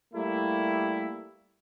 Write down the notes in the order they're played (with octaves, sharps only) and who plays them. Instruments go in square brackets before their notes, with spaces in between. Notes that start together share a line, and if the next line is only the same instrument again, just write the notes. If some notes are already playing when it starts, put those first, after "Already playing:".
[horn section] G3 A3 A#3 E4